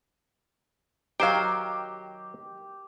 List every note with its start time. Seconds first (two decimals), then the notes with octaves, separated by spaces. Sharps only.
1.20 D#3 F#3 G4 C5 F5 G5